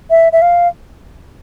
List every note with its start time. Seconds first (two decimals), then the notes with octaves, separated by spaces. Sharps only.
0.10 E5
0.33 E5
0.42 F5